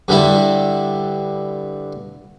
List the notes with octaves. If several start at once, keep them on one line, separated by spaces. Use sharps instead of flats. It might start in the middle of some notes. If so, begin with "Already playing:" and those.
G2 D3 G3 E4 A5